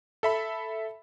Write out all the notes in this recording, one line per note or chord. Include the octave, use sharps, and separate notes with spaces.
A4 E5 B5